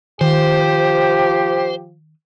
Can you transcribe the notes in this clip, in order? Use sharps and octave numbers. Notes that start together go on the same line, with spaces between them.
D#3 F3 G4 C5